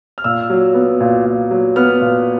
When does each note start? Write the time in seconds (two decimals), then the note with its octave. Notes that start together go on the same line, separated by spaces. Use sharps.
0.18 F6
0.24 A#2 E6
0.50 F#3
0.74 B3
1.00 A#2
1.25 A#2
1.51 F#3
1.76 B3 F6
2.01 A#2